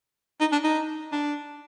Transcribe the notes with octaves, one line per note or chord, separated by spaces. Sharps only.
D#4
D4
D#4
D4